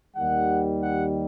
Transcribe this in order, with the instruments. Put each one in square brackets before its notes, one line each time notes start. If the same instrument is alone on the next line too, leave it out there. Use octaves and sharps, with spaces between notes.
[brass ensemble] D#2 D#3 G3 F#5
F#5